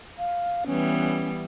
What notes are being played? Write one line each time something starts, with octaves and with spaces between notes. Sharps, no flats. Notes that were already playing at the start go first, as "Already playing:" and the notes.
F5
E3 G3 B3 C#4